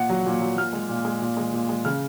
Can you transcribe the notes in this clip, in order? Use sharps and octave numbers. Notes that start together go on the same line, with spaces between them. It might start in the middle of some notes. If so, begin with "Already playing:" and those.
Already playing: A#2 F#5
F#3
A#2
F#3
A#2 F6
G#3
A#2
G#3
A#2
G#3
A#2
G#3
C#3 F6